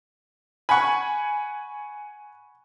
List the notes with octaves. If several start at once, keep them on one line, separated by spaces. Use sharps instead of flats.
F#5 G#5 B5 C#6